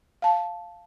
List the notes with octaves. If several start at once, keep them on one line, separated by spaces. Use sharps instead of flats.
F5 A5